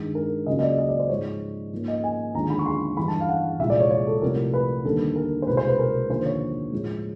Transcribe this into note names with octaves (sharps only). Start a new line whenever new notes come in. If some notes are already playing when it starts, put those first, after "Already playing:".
Already playing: G2 D#3 G#3
A#4
C#2 C#3 F#3 A#3 D#5
D#5
D5
D#5
D5
C5
G#2 F3 G#3 C#5
G#2 F3 A#3
D#5
G#5
D#2 D3 F3 G#3 A#5
B5
C#6
C6
G2 E3 G3 B5
A5
F5
F#5
C2 A#2 F3 G#3 E5
D5
C#5
C#5
A4
C2 C3 F3 A3 A#4
B4
D#2 D3 G3 A#3 A4
A#4
C5
C2 B2 G#3 B4
C5
B4
A#4
D#2 D3 F3 A#3 C5
C#5
A2 F3 G#3